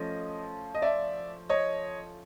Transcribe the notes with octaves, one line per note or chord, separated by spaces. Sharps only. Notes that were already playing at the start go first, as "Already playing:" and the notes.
Already playing: F3 A3 C#4 D#5
D#5
D5 E5
C#5 D#5